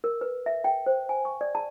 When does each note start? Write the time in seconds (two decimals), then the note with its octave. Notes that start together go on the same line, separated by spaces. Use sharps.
0.04 A#4
0.21 B4
0.46 E5
0.64 G5
0.86 C5
1.09 G#5
1.25 C#6
1.41 D5
1.55 A5